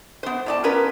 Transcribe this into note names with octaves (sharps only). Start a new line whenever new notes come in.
B3 C5
A2 D5 A5
B3 C#4 F4 A#4 B4